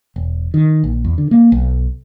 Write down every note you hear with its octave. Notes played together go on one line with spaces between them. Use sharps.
E1
D#3
A#1
E2
D3
A#3
B1